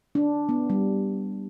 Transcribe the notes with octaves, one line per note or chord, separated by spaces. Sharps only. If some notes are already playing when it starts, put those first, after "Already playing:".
D4
B3
G3